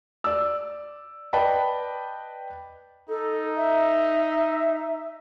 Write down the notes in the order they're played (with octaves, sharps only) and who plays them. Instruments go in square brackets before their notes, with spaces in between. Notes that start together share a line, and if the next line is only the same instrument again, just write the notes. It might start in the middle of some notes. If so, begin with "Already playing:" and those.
[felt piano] D5 E6
B4 D5 D#5 G5 A5 B5
[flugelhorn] D#4 [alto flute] A4
[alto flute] E5